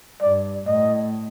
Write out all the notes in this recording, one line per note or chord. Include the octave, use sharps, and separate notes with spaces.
G2 D5
A2 D#5